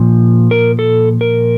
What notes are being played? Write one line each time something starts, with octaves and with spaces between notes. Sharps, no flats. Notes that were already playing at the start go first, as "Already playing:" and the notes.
Already playing: A#2 F3
A#4
A4
A#4